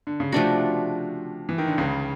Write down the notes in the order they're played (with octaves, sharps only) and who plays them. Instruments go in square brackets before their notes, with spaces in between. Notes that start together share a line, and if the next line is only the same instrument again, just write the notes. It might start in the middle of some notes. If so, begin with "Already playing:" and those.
[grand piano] D3
C#3
[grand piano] C3 [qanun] F3 A3 D4 F#4
[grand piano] E3
D#3
D3
C#2 C#3